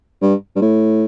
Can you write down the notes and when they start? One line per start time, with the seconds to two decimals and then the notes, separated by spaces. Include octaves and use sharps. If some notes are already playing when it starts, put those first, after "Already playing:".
0.22 G2
0.56 G2
0.61 A2